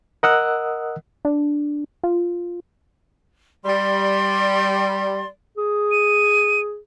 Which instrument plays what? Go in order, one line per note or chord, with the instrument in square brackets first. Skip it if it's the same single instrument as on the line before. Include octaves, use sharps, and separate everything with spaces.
[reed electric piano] A#4 D#5 F#5 D#6 E6 F#6
[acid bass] D4
F4
[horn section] G3 [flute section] D5 C6
[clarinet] G#4
[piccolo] D#7